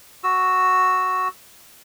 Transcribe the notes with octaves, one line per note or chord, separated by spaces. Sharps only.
F#4 E6